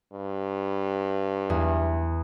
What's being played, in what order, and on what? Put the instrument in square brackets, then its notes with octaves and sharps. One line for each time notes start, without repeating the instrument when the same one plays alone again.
[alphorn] G2
[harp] E2